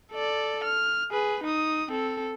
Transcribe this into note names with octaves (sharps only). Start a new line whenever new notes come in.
A4 D5
F6
G#4 B4
D#4 D#6
C4 A4